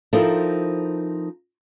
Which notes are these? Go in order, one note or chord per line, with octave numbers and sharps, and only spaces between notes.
F3 C4 D#4 E4 A4 A#4